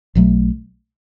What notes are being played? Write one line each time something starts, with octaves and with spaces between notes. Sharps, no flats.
B1 B2 F#3 A3